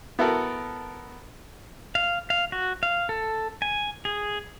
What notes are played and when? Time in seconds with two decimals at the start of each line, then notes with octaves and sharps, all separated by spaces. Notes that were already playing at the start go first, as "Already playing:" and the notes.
0.19 B3 E4 F#4 A4 A#4
1.95 F5
2.30 F5
2.52 F#4
2.83 F5
3.09 A4
3.62 G#5
4.05 G#4